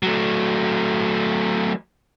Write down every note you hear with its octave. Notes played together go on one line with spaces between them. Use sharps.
F#3 A3